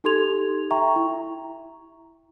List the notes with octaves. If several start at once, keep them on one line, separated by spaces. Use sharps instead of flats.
D#4 G4 A4 C6 G#6 F7
E5 G5 A#5 C#6
E4